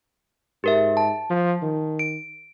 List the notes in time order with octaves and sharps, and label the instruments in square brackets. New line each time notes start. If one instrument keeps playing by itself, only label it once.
[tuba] G#2 [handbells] G4 A#4 E5
[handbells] A5
[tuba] F3
D#3
[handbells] D7